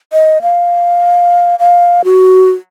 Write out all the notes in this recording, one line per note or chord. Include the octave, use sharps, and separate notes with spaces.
D#5
F5
F5
F#4